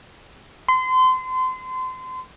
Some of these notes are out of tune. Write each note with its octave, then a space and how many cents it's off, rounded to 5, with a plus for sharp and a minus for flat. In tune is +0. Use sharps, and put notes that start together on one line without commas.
C6 -30